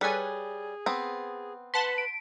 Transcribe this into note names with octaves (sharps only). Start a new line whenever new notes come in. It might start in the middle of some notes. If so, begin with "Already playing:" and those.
G3 G#4 A4 B4 C#5 G#5
B3 C4
B4 F#5 A5 C6 B6
D7